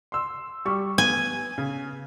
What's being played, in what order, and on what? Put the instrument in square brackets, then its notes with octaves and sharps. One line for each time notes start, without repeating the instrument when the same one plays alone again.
[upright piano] C6 E6
G3 C#6
[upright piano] B3 [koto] G#5
[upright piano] C#3